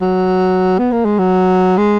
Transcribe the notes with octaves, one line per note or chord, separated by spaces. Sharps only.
F#3
B3
A#3
G#3
F#3
G#3